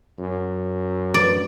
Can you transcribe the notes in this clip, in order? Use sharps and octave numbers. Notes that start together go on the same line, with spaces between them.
F#2
D5